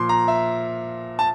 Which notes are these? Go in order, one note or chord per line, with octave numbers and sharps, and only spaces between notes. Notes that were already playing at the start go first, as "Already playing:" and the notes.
Already playing: A#2 F3 C6 D6
A#5
E5
A5